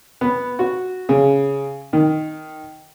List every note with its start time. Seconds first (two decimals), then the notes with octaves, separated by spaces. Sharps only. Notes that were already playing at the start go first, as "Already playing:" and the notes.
0.21 B3
0.59 F#4
1.09 C#3
1.93 D#3